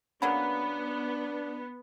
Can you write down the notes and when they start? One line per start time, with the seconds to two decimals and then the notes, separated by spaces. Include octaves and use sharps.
0.22 C#3 F#3 A#3 B3 D4 B5